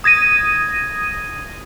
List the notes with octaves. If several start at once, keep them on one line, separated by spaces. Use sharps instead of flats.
D#6 G#6 A#6 D#7